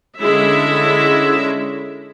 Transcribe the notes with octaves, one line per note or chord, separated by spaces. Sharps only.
D3 G#3 C#4 E4 E5